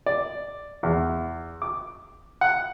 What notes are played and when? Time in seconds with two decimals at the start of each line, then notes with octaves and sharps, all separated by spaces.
0.06 D5
0.83 E2
1.62 D6
2.41 F#5